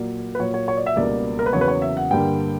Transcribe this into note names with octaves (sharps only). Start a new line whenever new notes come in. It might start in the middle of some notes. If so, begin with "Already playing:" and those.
Already playing: A#2 F#3 A#3 D5
B4
A#2 F#3 A#3 C#5
C#5
C#5
D5
E5
C#2 B2 G3 A#3 D5
A#4
B4
E2 C#3 F#3 A#3 C#5
B4
C#5
E5
F#5
G2 D3 G3 A#3 G5